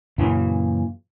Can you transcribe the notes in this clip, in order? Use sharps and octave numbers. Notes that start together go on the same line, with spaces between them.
F#2 A#2 C#3 E3